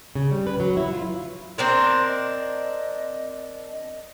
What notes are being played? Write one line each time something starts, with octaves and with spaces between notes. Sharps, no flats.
C#3
G3
B4
F#3
E4
F4
C4 D4 A#4 C6
D#5
D#5